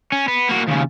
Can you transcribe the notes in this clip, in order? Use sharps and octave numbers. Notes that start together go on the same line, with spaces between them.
C#4
B3
A#3 F#4
D#2 C#3